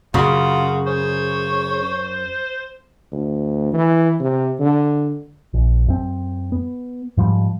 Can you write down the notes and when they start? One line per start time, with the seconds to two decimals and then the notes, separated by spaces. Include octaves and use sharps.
0.14 F#2 C#3 F4 F#4
0.87 C5 C#5
3.12 D2
3.73 E3
4.20 C3
4.59 D3
5.54 A#1
5.88 F#2 C4
6.52 B3
7.17 G#2 F3 G3